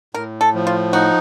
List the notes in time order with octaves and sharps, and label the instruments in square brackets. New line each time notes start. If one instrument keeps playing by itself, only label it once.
[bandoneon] A2 [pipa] A#4
[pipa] A4
[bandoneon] F3
[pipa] F4
[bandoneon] D#4 [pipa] F#4